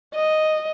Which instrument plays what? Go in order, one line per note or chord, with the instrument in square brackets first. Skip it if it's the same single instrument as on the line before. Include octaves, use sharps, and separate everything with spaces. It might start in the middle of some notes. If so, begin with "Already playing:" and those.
[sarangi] D#5